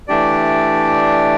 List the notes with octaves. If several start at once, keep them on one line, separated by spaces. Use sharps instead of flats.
E3 A3 D4 G4 D5